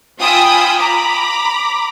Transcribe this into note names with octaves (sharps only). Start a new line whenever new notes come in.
F4 G5 G#5 B5 D#6 E6
A#5 B5 D6